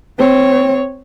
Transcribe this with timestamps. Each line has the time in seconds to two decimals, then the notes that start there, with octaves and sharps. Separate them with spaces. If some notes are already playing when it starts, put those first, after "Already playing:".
0.19 C4 C#5